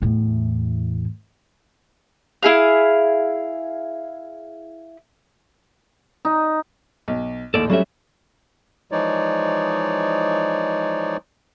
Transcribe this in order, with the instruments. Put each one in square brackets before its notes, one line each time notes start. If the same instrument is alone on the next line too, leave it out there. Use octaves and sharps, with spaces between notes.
[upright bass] E2 A2
[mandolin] E4 G#4 F5
[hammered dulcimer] D#4
[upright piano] B1
[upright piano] A#1 D#2 A2 [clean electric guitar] A4 D5
[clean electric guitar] F#3 F#4 E5 [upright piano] G3 A3 C#4
[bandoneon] E3 F3 G#3 D#4 C#5 D5